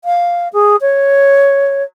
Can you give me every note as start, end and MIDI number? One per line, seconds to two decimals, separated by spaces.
0.05 0.48 77
0.53 0.76 68
0.81 1.83 73